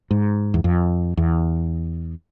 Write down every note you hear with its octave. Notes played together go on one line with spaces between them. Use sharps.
G#2
E2
F2
E2